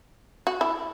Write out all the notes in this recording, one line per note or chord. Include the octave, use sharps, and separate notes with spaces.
F#4
E4